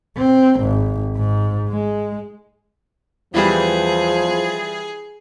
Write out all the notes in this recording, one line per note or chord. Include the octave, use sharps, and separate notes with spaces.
C4
G#1
G#2
G#3
E2 E3 F3 G3 E4 G#4